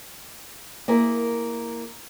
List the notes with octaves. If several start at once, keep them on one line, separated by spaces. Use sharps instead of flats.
A#3 E4 G#4 A#4